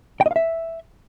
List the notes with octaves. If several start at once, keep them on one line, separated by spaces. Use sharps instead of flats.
G5
D#5
F5
E5